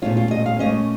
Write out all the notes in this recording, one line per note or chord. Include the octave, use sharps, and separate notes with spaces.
A#2 A3 C#4 F4
F4
D#5
F5
A#2 A3 C#4 D#5